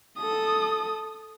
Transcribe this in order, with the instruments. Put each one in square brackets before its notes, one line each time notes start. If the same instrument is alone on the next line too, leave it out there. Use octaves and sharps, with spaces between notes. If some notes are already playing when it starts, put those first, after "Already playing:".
[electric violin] A4 D#6